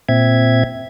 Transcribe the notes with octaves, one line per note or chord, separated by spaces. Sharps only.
A#2 C4 E5 G#6